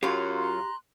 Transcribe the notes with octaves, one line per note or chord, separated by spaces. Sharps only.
F#2 F#3 F4 G4 F5
A#5 C6 F#6